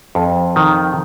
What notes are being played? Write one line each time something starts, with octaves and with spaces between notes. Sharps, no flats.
F2
D#3